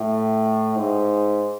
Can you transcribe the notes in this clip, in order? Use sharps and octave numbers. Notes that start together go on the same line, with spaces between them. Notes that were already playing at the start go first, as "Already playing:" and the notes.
Already playing: A2
G#2